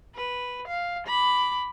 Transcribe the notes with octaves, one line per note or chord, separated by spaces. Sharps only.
B4
F5
B5 D6